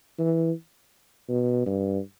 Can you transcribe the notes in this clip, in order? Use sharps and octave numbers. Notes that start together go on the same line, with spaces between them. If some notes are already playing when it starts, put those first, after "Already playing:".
E3
B2
G2